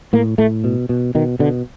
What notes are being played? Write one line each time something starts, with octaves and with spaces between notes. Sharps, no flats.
A2 A#3
A2 A3
B2
B2
B2 D#3
B2 D3